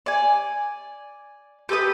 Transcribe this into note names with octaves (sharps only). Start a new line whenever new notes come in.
D5 G#5
G4 A4 B4 D#6